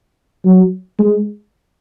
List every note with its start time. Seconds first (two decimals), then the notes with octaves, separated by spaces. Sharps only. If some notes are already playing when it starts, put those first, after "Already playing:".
0.45 F#3
0.99 G#3